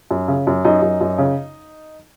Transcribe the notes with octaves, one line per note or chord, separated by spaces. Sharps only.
F#2
C#3
F#2
F#2 D#4
F#2
F#2
C#3